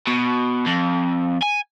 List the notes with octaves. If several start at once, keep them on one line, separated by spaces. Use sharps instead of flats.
B2
F2
G#5